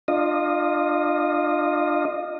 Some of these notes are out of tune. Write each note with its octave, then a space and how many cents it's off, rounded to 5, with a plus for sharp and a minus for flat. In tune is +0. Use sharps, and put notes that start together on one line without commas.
D4 +30 F4 +5 D#5 -10